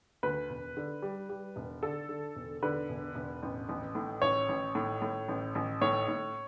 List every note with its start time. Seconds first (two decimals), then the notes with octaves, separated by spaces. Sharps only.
0.23 D2 B4
0.49 E1
0.77 D3
1.02 G3
1.29 G3
1.56 E1
1.83 D3 A4
2.09 D3
2.36 E1
2.63 D3 B4
2.89 E1
3.15 E1
3.42 A1
3.69 A1
3.95 A2
4.22 A1 C#5
4.49 A1
4.75 A2
5.02 A2
5.28 A1
5.55 A1
5.81 A2 C#5
6.08 A2